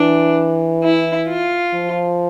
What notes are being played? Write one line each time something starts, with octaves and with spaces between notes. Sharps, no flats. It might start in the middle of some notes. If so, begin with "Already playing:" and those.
Already playing: E3 D4
E4
F4
F3